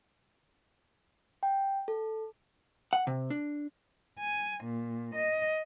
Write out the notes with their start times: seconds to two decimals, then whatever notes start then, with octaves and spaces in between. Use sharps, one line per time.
1.43 G5
1.88 A4
2.93 F#5
3.07 C3
3.30 D4
4.19 G#5
4.65 A#2
5.16 D#5